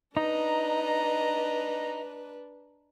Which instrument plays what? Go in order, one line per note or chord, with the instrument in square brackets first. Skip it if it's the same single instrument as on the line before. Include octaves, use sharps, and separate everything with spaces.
[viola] D4 B4 [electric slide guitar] D#4 [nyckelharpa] D#5 A#5